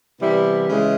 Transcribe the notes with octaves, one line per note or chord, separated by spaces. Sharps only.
C3 E3 G3 B3 E4
C#3 E3 G#3